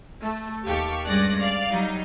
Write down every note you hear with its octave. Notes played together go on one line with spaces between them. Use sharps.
A3
D#2 G4 A4 F5 C#6
G2 G#3 C#4 D5 F#6 A#6
D5 F5
F#3 G3 D#4